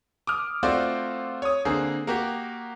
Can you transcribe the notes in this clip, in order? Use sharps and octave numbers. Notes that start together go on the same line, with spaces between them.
D6 D#6 F6
A3 C4 F4 F#4 C5 D5
C#5 D#6
D3 A#3 C4 G#4
A#3 F#4 G4